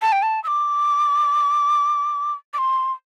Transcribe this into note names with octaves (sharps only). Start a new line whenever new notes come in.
A5
G5
A5
E6
D6
D6
C6